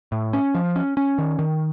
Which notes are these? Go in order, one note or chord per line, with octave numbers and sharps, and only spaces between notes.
A2
C#4
F3
C#4
C#4
D#3
D#3